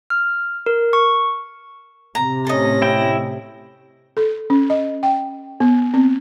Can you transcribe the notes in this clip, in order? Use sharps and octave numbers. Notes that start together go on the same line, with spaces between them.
F6
A#4
C#6
C3 A#5
A2 C#4 A4 D#5 A#6
E4 G5
A4
C#4
D#5
G5
B3
C4